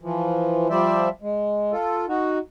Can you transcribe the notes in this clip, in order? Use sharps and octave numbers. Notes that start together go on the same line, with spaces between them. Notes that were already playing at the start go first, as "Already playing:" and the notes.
E3 F3
F3 G3 C5 D5 E5
G#3
F4 A4
D#4 F#4